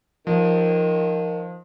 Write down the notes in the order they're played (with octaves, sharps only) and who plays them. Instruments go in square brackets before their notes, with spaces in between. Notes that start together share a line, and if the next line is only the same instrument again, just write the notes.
[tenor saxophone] D#3 [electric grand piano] F3